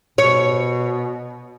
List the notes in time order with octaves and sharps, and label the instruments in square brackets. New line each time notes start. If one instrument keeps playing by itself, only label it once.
[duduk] B2 [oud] C#5